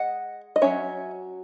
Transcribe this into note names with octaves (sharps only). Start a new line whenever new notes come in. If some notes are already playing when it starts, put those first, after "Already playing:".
Already playing: G#3 D#5 F#5
D#5
F#3 C#4 C#5 E5